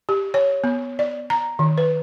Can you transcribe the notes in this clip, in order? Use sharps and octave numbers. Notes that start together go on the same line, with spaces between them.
G4
C#5
B3
D5
A#5
D#3
B4